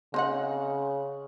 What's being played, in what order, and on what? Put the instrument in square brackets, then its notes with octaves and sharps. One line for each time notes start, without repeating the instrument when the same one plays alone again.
[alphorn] C#3 [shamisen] C4 D#4 F#5